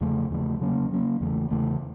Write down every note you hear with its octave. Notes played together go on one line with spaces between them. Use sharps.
E2 C#3 F3 A3
E2 C#3 F3 A3
C#3 F#3 A#3 C#4
C#3 F#3 A#3 C#4
E2 C#3 E3 A3
E2 C#3 E3 A3